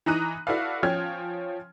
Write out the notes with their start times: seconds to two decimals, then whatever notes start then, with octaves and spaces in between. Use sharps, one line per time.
0.06 E3 D#4 A#5 D#6 F#6 D#7
0.47 E4 F#4 A4 B4 D5 F5
0.83 F3 C#4 G5 F6 G#6